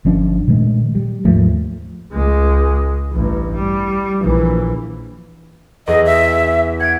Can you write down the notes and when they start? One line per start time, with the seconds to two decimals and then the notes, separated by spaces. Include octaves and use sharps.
0.05 G1 F3 C#4 D4
0.47 A#2 D#3 G#3 A3
0.95 G3
1.25 D#2 G#2 F3 A3
2.12 C#2 G#3
3.12 A1 G2
3.55 G3
4.20 A#1 E3
5.87 E2 G#4 D#5
6.06 E5
6.80 F#5 G#6 D7